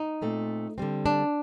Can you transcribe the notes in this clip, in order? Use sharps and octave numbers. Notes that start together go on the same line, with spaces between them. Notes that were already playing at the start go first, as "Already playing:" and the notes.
Already playing: D#4
A#2 A3 C4
D3 G3 C4
D4